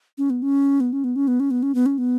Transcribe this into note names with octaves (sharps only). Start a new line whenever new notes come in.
C#4
B3
C#4
B3
C#4
B3
C#4
B3
C#4
B3
C#4
B3
C#4
B3